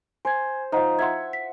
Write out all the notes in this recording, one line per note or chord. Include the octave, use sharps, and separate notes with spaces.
C5 G#5 G#6
F3 D#4 C5 D#5 F#5
E5 F#5 C6 G#6
B6